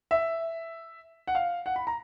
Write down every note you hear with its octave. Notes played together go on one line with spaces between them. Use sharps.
E5
F#5
F5
F#5
B5
A#5